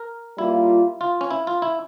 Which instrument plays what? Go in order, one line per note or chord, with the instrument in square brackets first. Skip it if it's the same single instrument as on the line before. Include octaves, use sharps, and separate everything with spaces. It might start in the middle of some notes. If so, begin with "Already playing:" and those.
Already playing: [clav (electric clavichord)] A#4
[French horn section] G3 A#3 F4 [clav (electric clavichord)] E4
[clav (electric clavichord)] F4
C#4
E4
F4
E4